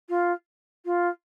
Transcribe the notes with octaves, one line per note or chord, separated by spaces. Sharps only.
F4
F4